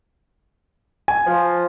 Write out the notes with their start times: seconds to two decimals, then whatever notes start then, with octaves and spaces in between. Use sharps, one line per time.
1.08 G#5
1.27 F3